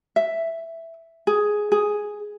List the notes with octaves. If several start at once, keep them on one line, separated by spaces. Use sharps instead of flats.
E5
G#4
G#4